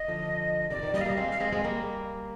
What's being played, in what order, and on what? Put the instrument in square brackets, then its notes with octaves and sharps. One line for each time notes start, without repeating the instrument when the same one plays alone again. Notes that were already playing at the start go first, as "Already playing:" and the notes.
Already playing: [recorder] D#5
[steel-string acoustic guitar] D3 F3
[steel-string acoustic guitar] C3 D#3 [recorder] D5
[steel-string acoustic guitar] C3 D#3
[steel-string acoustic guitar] G3 A#3 [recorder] D#5
[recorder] F5
[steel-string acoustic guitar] G3 A#3 [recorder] D#5
[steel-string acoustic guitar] G#3 C4 [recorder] F5
[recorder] F5
[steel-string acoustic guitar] G#3 C4 [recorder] D#5
[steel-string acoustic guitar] G#3 C4
G3 A#3